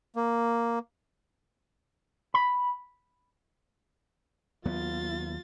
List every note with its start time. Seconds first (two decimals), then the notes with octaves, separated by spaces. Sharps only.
0.16 A#3
2.34 B5
4.65 D#2 F#3 B3 F4 A6